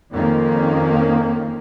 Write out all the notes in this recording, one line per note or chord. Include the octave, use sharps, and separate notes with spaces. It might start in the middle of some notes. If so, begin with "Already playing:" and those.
F2 D#3 A#3 C#4